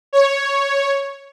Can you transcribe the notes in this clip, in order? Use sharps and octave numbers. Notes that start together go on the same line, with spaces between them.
C#5